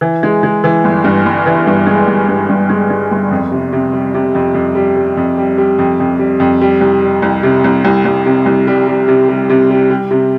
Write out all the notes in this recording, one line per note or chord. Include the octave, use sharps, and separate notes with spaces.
E3
G#3
G#3
E3
G1
G2
G1
E3
G2
G#3
G1
G2
G2
G#3
G#3
G1
F2
C3
C3
G3
C3
F2
F2
G3
G3
F2
G3
G3
F2
F2
G3
F2
G3
C2
G3
C2
C3
C2
C2
C2
C3
C2
G3
G3
C3
G3
C3
G3
G3
C3